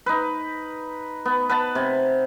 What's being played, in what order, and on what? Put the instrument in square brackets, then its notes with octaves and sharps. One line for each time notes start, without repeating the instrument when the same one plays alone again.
[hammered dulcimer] D#4 B4
B3
B4 F#5 A5
C3